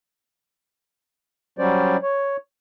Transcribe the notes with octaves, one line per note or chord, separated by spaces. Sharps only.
F#3 G3 C#4 C5 D5
C#5